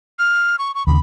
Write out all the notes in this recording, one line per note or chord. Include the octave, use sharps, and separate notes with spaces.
F6
C#6
C#6
D#2 C#3 B5